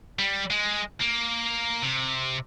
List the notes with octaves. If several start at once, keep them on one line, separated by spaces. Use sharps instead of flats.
G3
G#3
A#3
C3